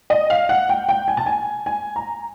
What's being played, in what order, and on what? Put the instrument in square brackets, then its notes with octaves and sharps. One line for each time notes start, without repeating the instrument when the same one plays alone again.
[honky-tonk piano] D#5
F5
F#5
G5
G5
G#5
A5
G#5
G#5
A#5